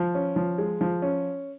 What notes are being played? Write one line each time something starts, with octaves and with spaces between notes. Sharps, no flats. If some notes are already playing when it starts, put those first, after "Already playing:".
Already playing: F3
C#4
F3
G#3
F3
C#4